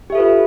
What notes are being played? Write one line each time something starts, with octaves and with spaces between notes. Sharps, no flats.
F4 G4 A4 B4 E5